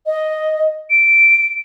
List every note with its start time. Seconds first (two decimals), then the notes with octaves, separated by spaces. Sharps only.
0.06 D#5
0.90 D7